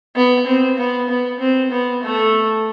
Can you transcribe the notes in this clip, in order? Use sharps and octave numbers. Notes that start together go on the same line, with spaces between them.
B3
C4
B3
B3
C4
B3
A3